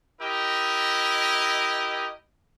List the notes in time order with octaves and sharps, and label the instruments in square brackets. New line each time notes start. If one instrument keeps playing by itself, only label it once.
[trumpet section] E4 G4 A#4 D#5